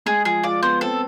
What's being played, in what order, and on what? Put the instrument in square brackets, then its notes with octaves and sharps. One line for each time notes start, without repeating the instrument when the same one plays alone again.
[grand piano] G#3 [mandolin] G#4
[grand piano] F3 [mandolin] G#4
[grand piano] F4 [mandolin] D5
[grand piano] B3 [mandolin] C5
[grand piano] C4 [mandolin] A4